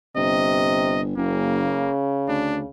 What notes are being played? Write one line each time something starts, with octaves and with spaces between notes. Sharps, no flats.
G1 C3 D#5
F#1 C#3 A#3
D2 D4